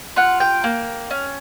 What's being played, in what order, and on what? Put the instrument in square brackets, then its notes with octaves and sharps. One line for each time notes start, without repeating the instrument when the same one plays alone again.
[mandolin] F4 F#5
G5
A#3
C#4